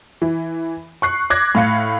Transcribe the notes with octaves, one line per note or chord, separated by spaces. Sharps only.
E3
C#6 F#6 C7
D6 F#6 G#6 A#6
A2 F5 C#7